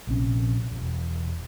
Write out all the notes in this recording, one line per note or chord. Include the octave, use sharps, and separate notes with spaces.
A#1 C3 C#4
E1